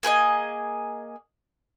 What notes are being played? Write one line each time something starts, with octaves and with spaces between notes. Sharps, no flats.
A#3 G#4 B4 D#5